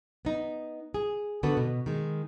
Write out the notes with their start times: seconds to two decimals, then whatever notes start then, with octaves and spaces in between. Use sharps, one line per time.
0.25 B3 D#4
0.94 G#4
1.43 D3 D#3 B3 F#4 A4 B4
1.57 B2
1.86 D#3 G#3